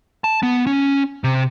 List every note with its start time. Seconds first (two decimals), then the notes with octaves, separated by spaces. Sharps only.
0.24 A5
0.43 B3
0.67 C#4
1.24 C3